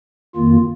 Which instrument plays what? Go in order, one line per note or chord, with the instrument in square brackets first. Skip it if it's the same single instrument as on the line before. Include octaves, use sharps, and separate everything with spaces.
[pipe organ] F2 D#3 A#3 F4